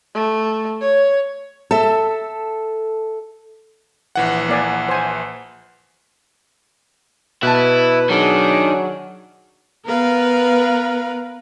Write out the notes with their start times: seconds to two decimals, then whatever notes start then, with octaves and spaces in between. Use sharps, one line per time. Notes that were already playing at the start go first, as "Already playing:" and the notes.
0.15 A3
0.81 C#5
1.71 A4 E5
4.15 A#1 E3 F#5
4.49 A#3 D5 G#5
4.89 C5 G#5
7.43 B2 E4 B4 A5
8.10 D#3 F#3 D4 G#4
9.86 B3 A#4 B4 F5